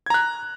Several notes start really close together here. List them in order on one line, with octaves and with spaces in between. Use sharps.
G#6 A#5 F#6